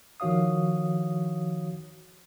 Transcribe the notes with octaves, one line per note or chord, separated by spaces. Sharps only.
D#3 F3 F#4 C#5 F5 D#6